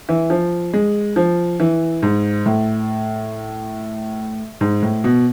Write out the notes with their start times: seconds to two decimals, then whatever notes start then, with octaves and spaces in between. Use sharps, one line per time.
0.09 E3
0.30 F3
0.73 G#3
1.16 F3
1.60 E3
2.03 G#2
2.46 A2
4.61 G#2
4.82 A2
5.04 B2